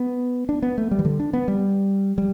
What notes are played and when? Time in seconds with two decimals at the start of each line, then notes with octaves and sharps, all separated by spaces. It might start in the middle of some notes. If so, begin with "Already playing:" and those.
Already playing: B3
0.49 D4
0.62 B3
0.78 A3
0.91 G3
0.99 E3
1.05 D3
1.20 D4
1.33 B3
1.48 G3
2.18 G3